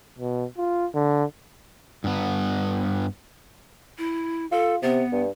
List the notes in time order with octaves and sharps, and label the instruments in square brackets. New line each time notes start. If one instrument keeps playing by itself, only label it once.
[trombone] B2
F4
D3
[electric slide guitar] G2 B3
[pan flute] E4
[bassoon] F4 [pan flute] A4
[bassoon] C3 [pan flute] B3
[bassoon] G2